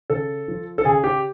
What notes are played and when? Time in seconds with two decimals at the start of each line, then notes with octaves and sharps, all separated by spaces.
0.10 C#3 A4
0.48 F3
0.78 A4
0.85 C#3 G#4
1.04 G4